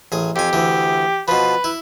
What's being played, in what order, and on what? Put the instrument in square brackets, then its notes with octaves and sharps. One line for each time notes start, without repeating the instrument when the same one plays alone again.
[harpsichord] A1 G#4
[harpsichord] F2 G#5 [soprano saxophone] G4
[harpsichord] D2 E3
[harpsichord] B2 F3 [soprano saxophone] B4
[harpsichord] E4